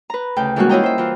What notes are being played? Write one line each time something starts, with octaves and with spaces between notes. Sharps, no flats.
B4 A#5
D2 C#3 G5
E3 G3 G#3 A#3 C#4 F#4
E4 F4 C#5 D#5 G5 A#5
C5 E5
E3 F4